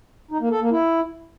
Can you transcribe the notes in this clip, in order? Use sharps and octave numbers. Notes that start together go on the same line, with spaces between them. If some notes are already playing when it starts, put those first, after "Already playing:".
D#4
A#3
A4
A#3
E4